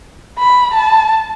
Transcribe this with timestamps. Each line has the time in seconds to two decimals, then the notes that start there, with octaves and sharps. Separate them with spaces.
0.39 B5
0.74 A5